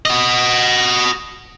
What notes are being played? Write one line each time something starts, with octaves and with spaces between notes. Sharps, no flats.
F#4 D#5